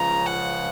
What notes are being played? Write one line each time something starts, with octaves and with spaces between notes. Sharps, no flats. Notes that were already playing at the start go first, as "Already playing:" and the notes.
Already playing: C#2 C#3 F3 A#5
F#5